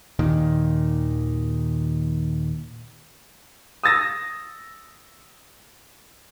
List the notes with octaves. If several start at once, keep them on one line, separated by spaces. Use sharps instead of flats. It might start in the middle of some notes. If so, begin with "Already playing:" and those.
D#2 A#2 D#3
D#6 E6 A6 A#6